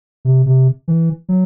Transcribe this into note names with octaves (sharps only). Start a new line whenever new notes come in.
C3
C3
E3
F#3